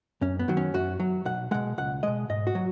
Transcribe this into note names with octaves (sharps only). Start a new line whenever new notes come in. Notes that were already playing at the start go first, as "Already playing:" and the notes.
F#2 C#4
B3
D#3 F#3
C#4
F#2 F#4
F#3
B1 F#5
B2 G#3 F#5
C#2 F#5
B2 G#3 D#5
G#2 D#5
F#4
F#3